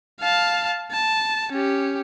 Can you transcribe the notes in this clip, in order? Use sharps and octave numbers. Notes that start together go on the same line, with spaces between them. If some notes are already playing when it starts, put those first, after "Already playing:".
F5 A5
A5
C#4 G4